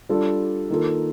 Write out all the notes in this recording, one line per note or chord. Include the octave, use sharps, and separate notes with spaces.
G3 D4 F4 A4
D#3 A#3 F4 A4